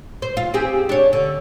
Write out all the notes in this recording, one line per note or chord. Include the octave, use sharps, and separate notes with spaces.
C5
F4
C4 G4 G#4
D4 C#5
D3